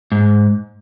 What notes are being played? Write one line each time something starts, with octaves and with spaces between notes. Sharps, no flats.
G#2